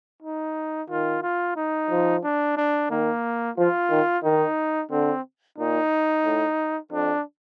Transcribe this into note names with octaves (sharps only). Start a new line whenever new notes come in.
D#4
D#3 F4
F4
D#4
F3
D4
D4
D#3 A#3
F3 F4
D#3
D#3 D#4
D3 C4
A#2 D#4
A2
F2 D4